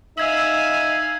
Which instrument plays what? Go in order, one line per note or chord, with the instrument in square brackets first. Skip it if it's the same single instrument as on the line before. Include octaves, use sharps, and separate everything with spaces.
[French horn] D#4 [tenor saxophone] E5 [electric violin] F5 G#5 [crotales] E6 G#6 F#7